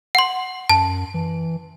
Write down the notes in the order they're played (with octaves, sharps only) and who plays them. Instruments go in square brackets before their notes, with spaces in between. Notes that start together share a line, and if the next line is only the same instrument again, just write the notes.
[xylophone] F#5 C6
[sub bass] F#2 [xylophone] A5
[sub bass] E3